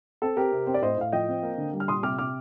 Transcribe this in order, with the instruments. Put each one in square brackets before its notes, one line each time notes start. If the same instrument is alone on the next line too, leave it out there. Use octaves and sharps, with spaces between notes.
[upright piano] C4 A4
C4 G4 A#4
C3
C4 C5
D5
A2 C5 D#5
A2 F5
F3 D#5 G5
C4
A#3
D3
G3
F6
A#2 C6 D#6
C3 D6 F6
C3 D6 F6